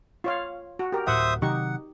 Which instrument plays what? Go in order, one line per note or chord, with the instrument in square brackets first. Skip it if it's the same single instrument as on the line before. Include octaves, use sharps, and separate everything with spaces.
[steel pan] F4 C#5 F5
F#4
G4 A#4
[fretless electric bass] D1 A2 [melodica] C5 E5 D#6 [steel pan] F#5
[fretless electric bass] C3 D#3 F#3 [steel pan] D#4 G4 C#6 [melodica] F#5